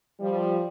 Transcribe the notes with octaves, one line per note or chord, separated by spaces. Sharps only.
F3 G3